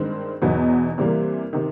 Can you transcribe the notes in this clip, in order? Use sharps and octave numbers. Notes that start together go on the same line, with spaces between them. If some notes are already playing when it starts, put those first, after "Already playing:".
Already playing: G2 D#3 G#3 C4
E2 B2 F#3 B3 D#4
C3 E3 G3 A#3
C3 D#3